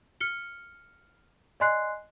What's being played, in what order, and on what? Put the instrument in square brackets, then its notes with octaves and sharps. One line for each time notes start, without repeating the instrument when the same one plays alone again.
[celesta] F6 C#7 G7
D5 D#5 G#5 C6 F#6 C7